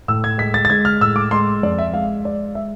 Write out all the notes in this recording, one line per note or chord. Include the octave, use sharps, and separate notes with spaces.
A2 E6
G#6
G#3 B6
A6
A6
G#3 G#6
F6
A2 E6
D6
G#3 C6
F2 D5
E5
G#3 F5
G#3 D5
G#3 E5